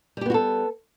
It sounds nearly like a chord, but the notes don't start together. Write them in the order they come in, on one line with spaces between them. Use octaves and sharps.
G3 G4 B3 F#4 A4